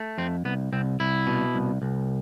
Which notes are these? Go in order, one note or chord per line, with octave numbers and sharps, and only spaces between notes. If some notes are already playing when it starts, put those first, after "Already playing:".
Already playing: A3
F2 C4
C2 B3
C2 C4
C2 E4
B2
C2
C2